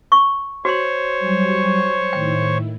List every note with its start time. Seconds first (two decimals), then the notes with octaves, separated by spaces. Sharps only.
0.12 C#6
0.65 F#4 C5 C#5 C6 C#6
1.19 F#3 G3 G#5
2.13 A2 D#3 E4 G5